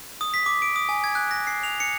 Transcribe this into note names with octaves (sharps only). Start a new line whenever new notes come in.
D#6
B6
D6
D7
D#6
G#5
G#6
F#6
A#6
C7
F7
C#7